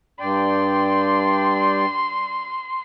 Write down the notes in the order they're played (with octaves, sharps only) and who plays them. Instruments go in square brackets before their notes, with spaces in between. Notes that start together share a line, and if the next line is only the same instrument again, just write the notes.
[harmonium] G2 D5 G5 [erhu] C6